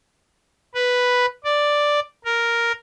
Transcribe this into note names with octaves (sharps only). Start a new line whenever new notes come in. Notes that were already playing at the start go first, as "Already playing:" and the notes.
B4
D5
A#4